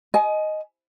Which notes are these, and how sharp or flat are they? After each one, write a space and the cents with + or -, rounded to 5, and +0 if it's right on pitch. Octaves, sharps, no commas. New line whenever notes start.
D#5 +0 G#5 +30